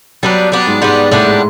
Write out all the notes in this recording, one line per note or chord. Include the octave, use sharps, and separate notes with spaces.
F#3 G3 B3 D4
G3 B3 D4
G#2 G#3
G#2 G3 G#3 B3 D4
A2 G3 A3 B3 D4
G#3